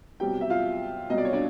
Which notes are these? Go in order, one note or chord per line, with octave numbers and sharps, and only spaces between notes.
C2 B2 F#3 G4 G5
E5
F4 F5
C2 B2 F#3 D#5
D5
C#5
D4 D5